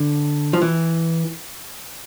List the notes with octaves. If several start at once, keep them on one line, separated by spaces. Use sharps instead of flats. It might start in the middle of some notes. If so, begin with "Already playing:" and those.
Already playing: D3
F3
E3